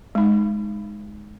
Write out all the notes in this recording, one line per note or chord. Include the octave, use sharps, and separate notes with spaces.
G#3 D#4